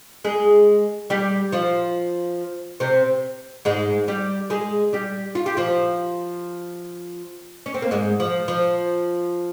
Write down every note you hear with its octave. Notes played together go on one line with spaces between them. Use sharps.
G#3 G#4
G3 G4
F3 F4
C3 C4
G#2 G#3
G3 G4
G#3 G#4
G3 G4
F4
G4
F3 F4
C#4
C4
A#3
G#2 G#3
F3
F3